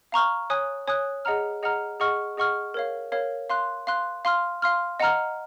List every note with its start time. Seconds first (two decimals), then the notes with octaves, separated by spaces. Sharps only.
0.12 F5 A#5 C#6 F6
0.50 C#5 G#5 D#6 F#6
0.88 C#5 G#5 D#6 F#6
1.25 G#4 D#5 F#5 A#5 F6
1.63 G#4 D#5 F#5 A#5 F6
2.00 G#4 D#5 F#5 C#6 F6
2.38 G#4 D#5 F#5 C#6 F6
2.74 A#4 C#5 F5
3.12 A#4 C#5 F5
3.50 F5 C6 F#6
3.87 F5 C6 F#6
4.25 F5 C6 F6
4.62 F5 C6 F6
5.00 D#5 F#5 A#5 F6